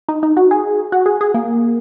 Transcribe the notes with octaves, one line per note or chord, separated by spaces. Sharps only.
D#4
D#4
F#4
G#4
F#4
G#4
G#4
A#3